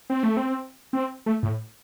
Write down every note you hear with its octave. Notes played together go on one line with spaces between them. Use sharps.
C4
A3
C4
C4
A3
A2